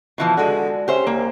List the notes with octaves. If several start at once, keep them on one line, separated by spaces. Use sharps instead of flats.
B2 E3 F3
D3 G#3 F#4
C#4 G4 C5 E5
C2 A#3